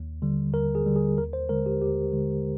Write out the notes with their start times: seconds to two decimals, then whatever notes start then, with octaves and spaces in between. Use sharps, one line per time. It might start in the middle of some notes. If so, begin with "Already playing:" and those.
Already playing: D#2
0.22 D3 G3
0.54 D#2 A#4
0.75 G#4
0.86 D3 G3
0.96 G#4
1.18 D#2 A#4
1.33 C5
1.49 D3 G#3 A#4
1.66 G4
1.81 D#2 G4
2.13 D3 G#3